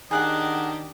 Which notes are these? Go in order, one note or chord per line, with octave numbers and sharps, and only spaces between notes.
D#3 D4 G4 G#4 D#5 F#5 G#5